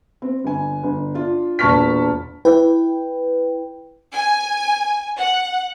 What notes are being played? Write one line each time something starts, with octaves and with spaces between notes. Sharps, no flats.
C4
G1 G#5
G1
D4 F4
E1 A#2 A5 C#6 F6 B6
E4 B4 G5
G#5
F#5